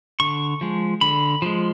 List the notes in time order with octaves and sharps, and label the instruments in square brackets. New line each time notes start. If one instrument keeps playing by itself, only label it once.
[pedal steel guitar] D3 C#6
F3 G#3
D3 B5
F3 G#3